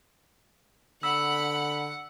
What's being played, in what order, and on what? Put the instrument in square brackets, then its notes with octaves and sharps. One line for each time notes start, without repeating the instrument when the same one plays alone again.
[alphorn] D3 [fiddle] F#5 [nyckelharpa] B5 [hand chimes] E6